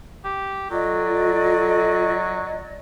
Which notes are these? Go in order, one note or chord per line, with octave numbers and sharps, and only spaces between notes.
G4
F#3 F4 A4 D5 D#5